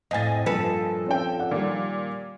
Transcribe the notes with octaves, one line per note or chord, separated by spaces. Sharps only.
F2 A2 D#5 G#5 A6
G2 A#2 F3 A4 B4
C4 C#4 G5
D5 F#5
A#2 D#3 G3